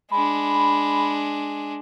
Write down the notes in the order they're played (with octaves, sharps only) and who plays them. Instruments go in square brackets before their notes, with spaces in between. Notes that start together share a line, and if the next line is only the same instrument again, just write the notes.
[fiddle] G#3 D4 [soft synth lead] B5